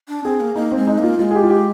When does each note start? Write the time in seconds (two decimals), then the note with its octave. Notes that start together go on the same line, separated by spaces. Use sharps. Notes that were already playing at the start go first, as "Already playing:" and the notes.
0.08 D4
0.24 C4 G#4
0.40 A#3
0.56 A#3 D#4
0.72 G#3 C4
0.87 D#4
0.98 A#3
1.03 F4
1.19 G#3 F4
1.31 G#4
1.35 G4
1.44 F4
1.50 G4